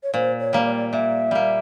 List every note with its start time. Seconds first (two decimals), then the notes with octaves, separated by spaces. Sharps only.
0.03 C#5
0.14 A#2 C5
0.40 C#5
0.53 G3 A#3
0.66 D5
0.92 A#2 E5
1.31 G3 A#3